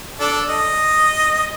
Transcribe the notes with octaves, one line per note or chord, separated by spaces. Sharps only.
D4 A4
D#5